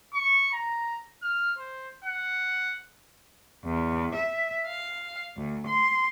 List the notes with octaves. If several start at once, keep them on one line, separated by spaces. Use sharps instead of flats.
C#6
A#5
F6
C5
F#5
E2
E5
F5
D2
C6